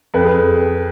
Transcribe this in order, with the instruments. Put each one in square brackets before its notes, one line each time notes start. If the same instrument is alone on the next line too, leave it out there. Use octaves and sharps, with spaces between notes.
[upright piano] F2 B4
G#4